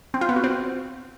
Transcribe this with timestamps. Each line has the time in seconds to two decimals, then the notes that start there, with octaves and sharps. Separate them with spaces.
0.14 C4
0.21 F4
0.29 B3
0.36 F#4
0.44 C4